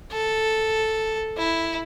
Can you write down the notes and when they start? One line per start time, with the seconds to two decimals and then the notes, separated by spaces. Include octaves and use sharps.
0.12 A4
1.38 E4